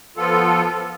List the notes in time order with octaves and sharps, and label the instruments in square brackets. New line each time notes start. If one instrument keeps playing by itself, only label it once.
[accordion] F3 B3 F4 A4